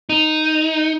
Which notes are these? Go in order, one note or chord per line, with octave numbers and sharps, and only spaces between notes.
D#4